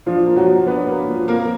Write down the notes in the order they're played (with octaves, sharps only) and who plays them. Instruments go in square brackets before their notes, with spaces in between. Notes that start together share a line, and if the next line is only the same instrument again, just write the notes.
[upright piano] F3 D4 F4
A#3
F#3 F#4
F#3
B3 D4 B4
A#3
F3
A#3 C4 A#4